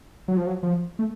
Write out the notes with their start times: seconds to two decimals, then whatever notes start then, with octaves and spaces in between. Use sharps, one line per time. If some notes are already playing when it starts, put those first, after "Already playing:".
0.28 F#3
0.37 F3
0.47 F#3
0.63 F3
0.99 A3